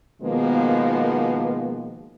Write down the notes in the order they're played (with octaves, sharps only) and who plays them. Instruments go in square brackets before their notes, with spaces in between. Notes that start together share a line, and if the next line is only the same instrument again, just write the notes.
[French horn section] B2 D#3 F3 G#3 A#3 B3